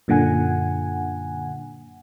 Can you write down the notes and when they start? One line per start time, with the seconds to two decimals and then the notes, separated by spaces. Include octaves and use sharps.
0.08 F#2 A#2 D3 F#5 G#5